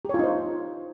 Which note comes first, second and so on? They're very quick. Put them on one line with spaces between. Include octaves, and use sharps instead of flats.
G4 C#5 F4 D#4 C5